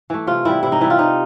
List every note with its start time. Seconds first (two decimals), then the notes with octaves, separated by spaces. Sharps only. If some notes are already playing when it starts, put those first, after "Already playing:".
0.10 E3 A3
0.27 C3 F4
0.45 E3 G3 E4
0.63 C3 E4
0.72 D#4
0.81 E3 G3 E4
0.90 F4
0.99 C3 D#4